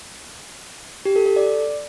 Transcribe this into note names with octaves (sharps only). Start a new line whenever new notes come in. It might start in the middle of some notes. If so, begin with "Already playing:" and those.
G4
A4
A4
D5